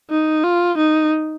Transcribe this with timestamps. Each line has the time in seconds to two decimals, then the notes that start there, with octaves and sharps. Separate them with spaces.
0.10 D#4
0.44 F4
0.78 D#4